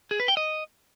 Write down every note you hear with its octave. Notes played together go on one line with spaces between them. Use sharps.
G#4
B4
G5
D#5